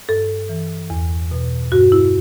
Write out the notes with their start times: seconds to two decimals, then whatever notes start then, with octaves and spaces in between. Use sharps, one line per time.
0.09 G2 A4
0.49 E3
0.90 E2
1.31 B2
1.72 G2 F#4
1.92 E4